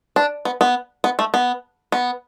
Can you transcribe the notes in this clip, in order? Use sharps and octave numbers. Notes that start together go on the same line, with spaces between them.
D4
B3
B3
B3
A3
B3
B3